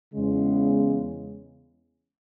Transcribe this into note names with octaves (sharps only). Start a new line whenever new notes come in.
E2 C#3 G#3